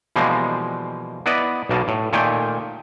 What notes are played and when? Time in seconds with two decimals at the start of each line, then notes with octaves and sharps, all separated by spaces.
0.16 B2 E3 F3 G3 G#3 A#3
1.26 B3 E4 B4 D5 D#5
1.69 B1 B2 A#3 A5
1.88 A2
2.13 A#2 D#3 A3 G5 G#5